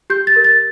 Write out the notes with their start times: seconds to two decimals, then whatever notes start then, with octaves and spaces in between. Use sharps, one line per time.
0.10 G4 G6
0.27 A6
0.36 A#4
0.44 A6